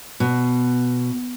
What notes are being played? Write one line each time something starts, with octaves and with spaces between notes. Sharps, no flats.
B2